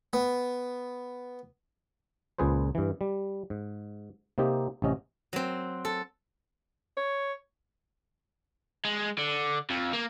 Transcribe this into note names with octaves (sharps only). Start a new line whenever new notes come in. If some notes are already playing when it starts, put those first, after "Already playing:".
B3
C#2 A#2 G#4 B4 C5
G2 E3
G3
G#2
C3 A#3 C4 D#4 G4
A1 C3 C#4 D#5
F#3 C4
A4
C#5
G#3
D3
F2
A#3